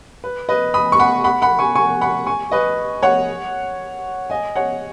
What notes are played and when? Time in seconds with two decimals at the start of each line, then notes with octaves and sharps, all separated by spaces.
0.24 B4
0.49 B4 D#5
0.74 B5 D#6
0.92 C#6
0.99 F#5 B5
1.24 F#5 B5
1.42 F#5 B5
1.59 G#5 C#6
1.75 G#5 C#6
2.01 F#5 B5
2.27 G#5 C#6
2.51 B4 D#5
3.03 C#5 F#5
4.30 D#5 G#5
4.56 C#5 F#5